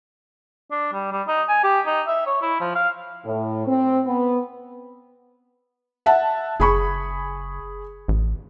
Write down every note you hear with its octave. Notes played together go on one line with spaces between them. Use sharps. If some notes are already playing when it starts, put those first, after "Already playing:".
D4
G3
G3
D#4
G#5
G4
D#4
E5
C#5
E4
F3
F5
A2
C4
B3
E5 F#5 A5
F#1 G#4 B5 C#6
A1